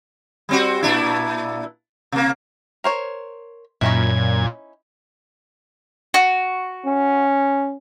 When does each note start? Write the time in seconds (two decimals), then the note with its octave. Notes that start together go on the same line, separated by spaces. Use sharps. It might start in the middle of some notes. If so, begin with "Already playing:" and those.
0.49 G3 C4 F#4
0.83 A#2 D4 E4
2.12 C3 A#3
2.84 A#4 C5 C#5
3.81 F#2 A#2 C#4 D#4 E4 G#6
6.14 F#4
6.85 C#4